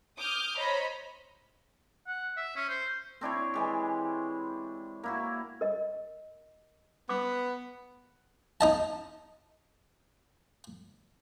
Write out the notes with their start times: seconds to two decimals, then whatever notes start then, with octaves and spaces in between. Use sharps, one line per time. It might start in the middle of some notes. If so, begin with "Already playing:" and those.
0.16 D6 D#6 F6 G6
0.57 C5 C#5 D#5 A#5 B5
2.07 F#5
2.37 E5
2.56 C#4
2.69 C5
3.21 C4 D4 E4 C#5
3.54 E3 G#3 G4
5.03 A#3 E4 F#4
5.61 A#4 D#5
7.09 B3 D6
8.61 D#4 D#5 A5